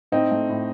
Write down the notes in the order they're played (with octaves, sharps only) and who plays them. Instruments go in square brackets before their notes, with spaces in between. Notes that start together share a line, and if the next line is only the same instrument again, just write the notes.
[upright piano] A2 C4 D#4
A3
A2